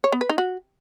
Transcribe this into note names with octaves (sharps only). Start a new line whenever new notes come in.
C#5
B3
B4
D#4
F#4